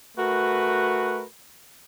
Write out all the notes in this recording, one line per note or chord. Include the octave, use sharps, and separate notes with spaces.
A3 F#4 A#4 B4